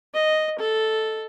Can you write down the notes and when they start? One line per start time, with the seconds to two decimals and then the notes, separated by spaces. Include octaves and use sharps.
0.14 D#5
0.59 A4